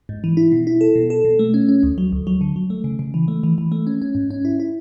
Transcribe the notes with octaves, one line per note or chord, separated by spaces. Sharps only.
G#2
E3
E4
B2
E4
A4
B2
A4
B2
A3
C#4
C#4
D2
F#3
D2
F#3
D3
F#3
A3
C#3
C#3
E3
A3
E3
E3
A3
C#4
C#4
G#2
C#4
E4
E4